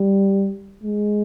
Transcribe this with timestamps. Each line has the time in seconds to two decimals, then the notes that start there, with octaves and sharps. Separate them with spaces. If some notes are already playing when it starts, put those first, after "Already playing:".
Already playing: G3
0.83 G#3